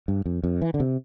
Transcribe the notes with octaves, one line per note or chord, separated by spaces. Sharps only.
G2
F2
F2
E3
D3
C3